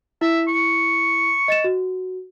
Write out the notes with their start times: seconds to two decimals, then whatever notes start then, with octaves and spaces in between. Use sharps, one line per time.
0.21 E4 E5
0.48 C#6
1.48 D#5 A6 E7
1.64 F#4